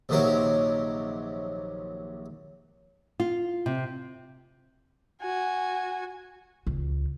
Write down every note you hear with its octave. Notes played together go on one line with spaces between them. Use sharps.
A#1 C3 D#3 F#3 C#4 A#4
F4
C3
F#4 G#5
C#2